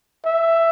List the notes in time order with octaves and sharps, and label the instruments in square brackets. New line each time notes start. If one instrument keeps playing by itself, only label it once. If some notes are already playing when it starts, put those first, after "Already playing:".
[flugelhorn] E5